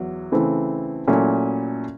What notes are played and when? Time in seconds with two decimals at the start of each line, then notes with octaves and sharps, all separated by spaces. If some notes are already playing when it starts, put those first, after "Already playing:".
Already playing: E2 F#3
0.32 C#3 E3 A3 C4
1.08 A#2 F#3 A3 C#4 E4